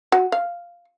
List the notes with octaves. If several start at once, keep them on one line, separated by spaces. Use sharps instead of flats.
F#4
F5